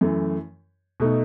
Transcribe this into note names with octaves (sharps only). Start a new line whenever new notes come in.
F#2 E3 A3
B2 A3 D#4